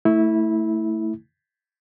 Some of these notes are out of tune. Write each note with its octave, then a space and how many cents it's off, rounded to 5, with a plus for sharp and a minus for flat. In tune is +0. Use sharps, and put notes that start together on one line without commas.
A3 +15 E4 -15